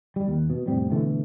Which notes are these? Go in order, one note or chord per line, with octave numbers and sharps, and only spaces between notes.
G3
D#2
B2
F1 A2 G3 C4
B2 D3 E3 A3